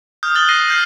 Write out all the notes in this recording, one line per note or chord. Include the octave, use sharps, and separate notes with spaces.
D#6 F6 G6
F#6 A6 F#7 G7
A#6 C7 D#7
F6 G6 C7